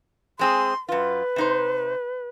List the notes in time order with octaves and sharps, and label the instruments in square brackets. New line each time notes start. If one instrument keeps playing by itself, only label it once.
[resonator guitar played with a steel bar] G#3 C4 G#4 [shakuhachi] C6
[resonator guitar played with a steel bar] F#2 F4 [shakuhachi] B4
[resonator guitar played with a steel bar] C3 D#4 C5